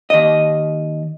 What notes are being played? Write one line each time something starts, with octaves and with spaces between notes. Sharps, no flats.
D#2 D#5